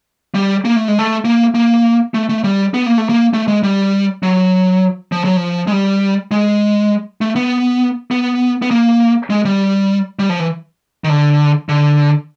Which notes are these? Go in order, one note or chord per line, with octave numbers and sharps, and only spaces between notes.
G3
A#3
A3
G#3
A3
A#3
A#3
A3
A3
G3
B3
A#3
A3
A#3
A3
G#3
G3
F#3
F3
F#3
F3
G#3
G3
G#3
A3
B3
B3
B3
A#3
G#3
G3
G3
F3
E3
D#3
D3
D3